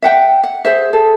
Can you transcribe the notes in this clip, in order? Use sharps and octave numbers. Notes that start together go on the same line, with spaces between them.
E5 F#5 G5
F#5
G#4 C5 E5
G#4 A4